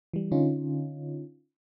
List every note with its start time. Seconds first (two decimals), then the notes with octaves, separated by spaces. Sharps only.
0.13 E3 G3
0.32 D3 C#4 D#4 F4